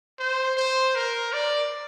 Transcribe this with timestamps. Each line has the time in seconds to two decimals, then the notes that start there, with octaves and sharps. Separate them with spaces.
0.19 C5
0.57 C5
0.95 A#4
1.33 D5